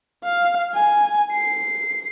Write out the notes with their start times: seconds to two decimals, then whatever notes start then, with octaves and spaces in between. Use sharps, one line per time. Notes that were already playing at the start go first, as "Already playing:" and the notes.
0.24 F5
0.75 G#5
1.31 C7